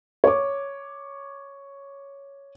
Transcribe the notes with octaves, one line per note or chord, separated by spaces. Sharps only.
C#5 D6